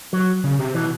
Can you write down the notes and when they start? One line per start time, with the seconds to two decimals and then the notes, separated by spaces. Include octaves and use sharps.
0.13 F#3
0.44 C#3
0.59 C3
0.75 B2 E3